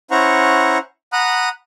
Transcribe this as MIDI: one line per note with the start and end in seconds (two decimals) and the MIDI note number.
0.11 0.78 61
0.11 0.78 64
0.11 0.78 72
0.11 0.78 78
0.11 0.78 82
0.11 0.78 85
1.13 1.49 78
1.13 1.49 82
1.13 1.49 83
1.13 1.49 87
1.13 1.49 90